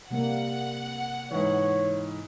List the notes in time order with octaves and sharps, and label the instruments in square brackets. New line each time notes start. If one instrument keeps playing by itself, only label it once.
[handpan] C3 G3 A#3 [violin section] F#5
[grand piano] G#2 E3 [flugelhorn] C#5